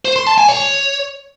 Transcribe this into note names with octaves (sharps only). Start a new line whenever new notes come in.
C5
C6
A5
G#5
C#5